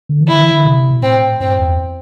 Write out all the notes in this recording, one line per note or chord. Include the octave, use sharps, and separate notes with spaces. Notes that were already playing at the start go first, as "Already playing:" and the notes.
D3
E3
D3 E4
E3
D3
C3
B2
A2 C4
G2 C4
E2